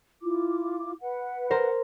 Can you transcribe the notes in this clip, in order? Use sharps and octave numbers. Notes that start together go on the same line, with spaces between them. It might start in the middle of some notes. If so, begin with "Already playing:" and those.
E4 F4 D6
B4 F#5
A#4 C5